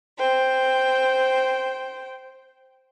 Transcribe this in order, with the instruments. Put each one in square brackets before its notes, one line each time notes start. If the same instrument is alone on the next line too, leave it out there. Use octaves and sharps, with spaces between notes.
[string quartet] C5 G5